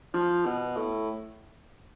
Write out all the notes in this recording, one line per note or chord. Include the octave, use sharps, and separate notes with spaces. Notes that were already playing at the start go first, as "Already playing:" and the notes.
F3
B2
A2